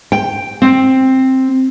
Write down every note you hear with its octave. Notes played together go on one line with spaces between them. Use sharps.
G5
C4